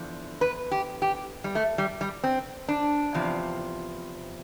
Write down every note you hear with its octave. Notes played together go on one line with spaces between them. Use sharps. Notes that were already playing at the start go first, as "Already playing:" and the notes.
Already playing: E2 D3 F3
B4
G4
G4
G3
A3
G3
G3
C4
D4
E2 C3 F3